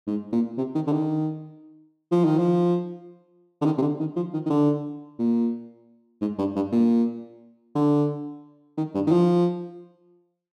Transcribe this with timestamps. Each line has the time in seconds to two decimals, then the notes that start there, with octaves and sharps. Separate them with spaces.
0.07 G#2
0.32 A#2
0.58 C3
0.75 D#3
0.87 D3
0.92 D#3
2.11 F3
2.24 D#3
2.38 F3
3.61 D3
3.65 D#3
3.78 C3
3.81 D3
4.00 D#3
4.16 F3
4.33 D#3
4.46 D#3
4.50 D3
5.19 A#2
6.21 G#2
6.38 G2
6.56 G2
6.72 A#2
7.75 D3
8.77 D#3
8.94 G2
9.07 D#3
9.11 F3